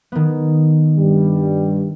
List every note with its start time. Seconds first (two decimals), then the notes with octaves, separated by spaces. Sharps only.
0.12 D#3 B3
0.97 G2 G3